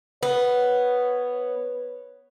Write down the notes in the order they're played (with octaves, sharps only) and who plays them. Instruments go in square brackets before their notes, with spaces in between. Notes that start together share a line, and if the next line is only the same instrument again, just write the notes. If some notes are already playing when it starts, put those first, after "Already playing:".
[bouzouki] B3 [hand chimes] B4 [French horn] C#5